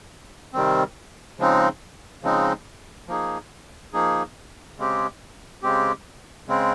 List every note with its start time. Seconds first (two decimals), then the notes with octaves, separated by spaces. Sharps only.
0.53 C3 D#3 G3 C4
1.39 C#3 F3 G#3 C4 D#4
2.23 C#3 F3 G#3 C4 D#4
3.08 F3 A#3 D#4 G#4
3.93 F3 A#3 D#4 G#4
4.77 C#3 G#3 C4 G4
5.63 C#3 G#3 C4 G4
6.47 C#3 G#3 C4